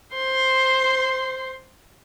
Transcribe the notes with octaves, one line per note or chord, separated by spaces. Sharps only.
C5 C6